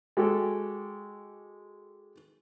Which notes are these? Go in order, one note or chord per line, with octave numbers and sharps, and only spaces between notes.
G#3 F#4 G4 A4